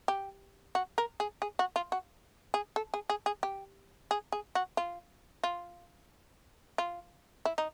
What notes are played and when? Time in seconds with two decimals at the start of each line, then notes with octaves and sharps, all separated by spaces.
0.08 G4
0.75 F#4
0.98 A#4
1.20 G#4
1.42 G#4
1.59 F#4
1.76 F4
1.92 F#4
2.54 G#4
2.76 A4
2.94 G#4
3.10 G#4
3.26 G#4
3.43 G4
4.11 G#4
4.32 G#4
4.55 F#4
4.77 F4
5.43 F4
6.78 F4
7.45 E4
7.58 D#4